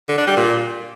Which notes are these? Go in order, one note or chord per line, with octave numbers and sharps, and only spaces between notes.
D3
D4
G3
A#2